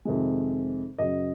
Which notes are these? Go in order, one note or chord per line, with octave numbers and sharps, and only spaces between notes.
F2 C3 D#3 G#3
F#2 C#3 F#3 D#5